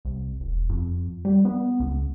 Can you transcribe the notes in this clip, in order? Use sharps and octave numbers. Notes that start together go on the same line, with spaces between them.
C2
E1
F2
G3
B3
C#2